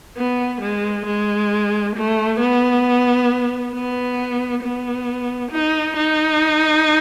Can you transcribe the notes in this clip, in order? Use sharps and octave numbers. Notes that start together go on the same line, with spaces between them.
B3
G#3
G#3
A3
B3
B3
B3
D#4
D#4